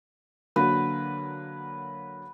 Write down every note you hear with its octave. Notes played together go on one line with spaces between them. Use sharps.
D3 F#3 A#3 B4